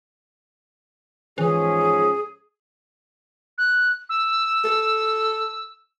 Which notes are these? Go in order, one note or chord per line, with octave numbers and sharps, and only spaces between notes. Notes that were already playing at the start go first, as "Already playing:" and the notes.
G#2 E3 F3 C#4 G#4
F#6
E6
A4